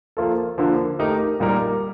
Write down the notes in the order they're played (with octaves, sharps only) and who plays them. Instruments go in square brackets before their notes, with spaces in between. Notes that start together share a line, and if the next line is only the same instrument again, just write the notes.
[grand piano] F3 A#3 F4 A4
D3 F3 A#3
A3 D#4 G4 A#4
A#2 G3 A#3 D#4 A#4